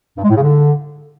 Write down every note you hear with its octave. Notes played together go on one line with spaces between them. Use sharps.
G2
G#3
A2
C#3
D3